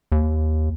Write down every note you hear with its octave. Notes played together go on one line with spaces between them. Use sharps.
D#2